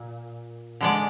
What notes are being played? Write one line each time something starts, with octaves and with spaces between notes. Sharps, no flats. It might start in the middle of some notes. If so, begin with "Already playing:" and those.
Already playing: A#2
D3 G#3 D5